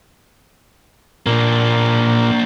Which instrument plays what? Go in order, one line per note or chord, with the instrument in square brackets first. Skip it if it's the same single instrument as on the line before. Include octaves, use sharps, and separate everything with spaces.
[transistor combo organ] A#2 [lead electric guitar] A#3 D4